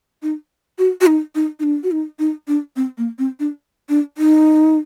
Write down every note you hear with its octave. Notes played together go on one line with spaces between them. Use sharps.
D#4
F#4
F#4
D#4
D#4
D#4
D4
F#4
D#4
D#4
D4
C4
A#3
C4
D4
D4
D#4